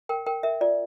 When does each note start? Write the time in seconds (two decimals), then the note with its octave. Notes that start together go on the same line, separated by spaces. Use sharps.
0.09 A#4 G5
0.26 A#4 G5
0.43 A#4 E5
0.61 F4 D5